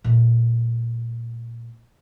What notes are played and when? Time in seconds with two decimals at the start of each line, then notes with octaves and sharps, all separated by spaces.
0.04 A#2 A3